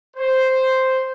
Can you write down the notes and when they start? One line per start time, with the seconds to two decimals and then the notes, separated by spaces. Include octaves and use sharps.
0.16 C5